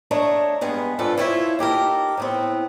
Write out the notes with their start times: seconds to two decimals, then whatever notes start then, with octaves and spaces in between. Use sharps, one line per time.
0.11 A3 D4 A#4 C#5 D#5
0.61 G2 G#3 B3
0.99 G2 C3 F4 A4 B4
1.18 E4 F4 C5 C#5 D#5 E5
1.59 D#4 G4 A4 A#4
2.17 A2 B3 C4